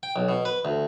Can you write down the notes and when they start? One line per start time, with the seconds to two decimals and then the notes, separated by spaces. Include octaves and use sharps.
0.03 G5
0.16 B1
0.29 B2
0.45 B4
0.65 D2